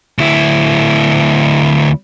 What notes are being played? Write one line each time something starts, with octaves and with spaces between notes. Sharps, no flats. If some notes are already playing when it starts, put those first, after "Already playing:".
D2 E4